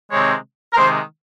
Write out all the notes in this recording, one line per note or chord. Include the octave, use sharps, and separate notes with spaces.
C3 D#3 G#3 C4 C#5
A#4
C3 D#3 G#3 C5